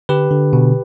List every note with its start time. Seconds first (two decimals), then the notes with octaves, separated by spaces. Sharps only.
0.09 D3 G4 B4
0.31 D3
0.53 B2